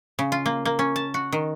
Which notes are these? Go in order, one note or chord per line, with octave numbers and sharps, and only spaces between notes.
C#3
F4
A#3
A#3
C#4
A5
F#4
D#3